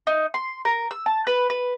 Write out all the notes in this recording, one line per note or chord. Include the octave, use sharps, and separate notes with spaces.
D#4
C6
A#4
E6
A5
B4
B4